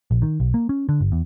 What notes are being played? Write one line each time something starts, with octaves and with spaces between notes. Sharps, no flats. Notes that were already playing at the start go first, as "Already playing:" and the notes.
A#1
D#3
B1
A#3
C#4
D3
G1
E2